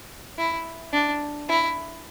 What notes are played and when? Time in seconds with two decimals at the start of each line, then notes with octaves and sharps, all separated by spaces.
0.38 E4
0.93 D4
1.49 E4